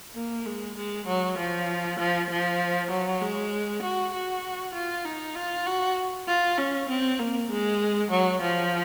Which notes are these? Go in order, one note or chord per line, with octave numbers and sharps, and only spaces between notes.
A#3
G#3
G#3
F#3
F3
F3
F3
F#3
G#3
F#4
F#4
F4
D#4
F4
F#4
F4
C#4
C4
A#3
G#3
F#3
F3